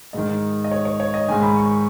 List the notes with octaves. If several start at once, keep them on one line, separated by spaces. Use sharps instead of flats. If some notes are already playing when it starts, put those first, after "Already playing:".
G#2 D#3 D#5
D#5
C#5
C#5
C#5
D#5
G#2 D#3 G#5
B5
C#6